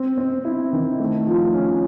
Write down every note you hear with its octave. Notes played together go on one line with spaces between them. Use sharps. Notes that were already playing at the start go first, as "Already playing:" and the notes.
Already playing: C4
C4
E4
D#3
A3
F3
C#4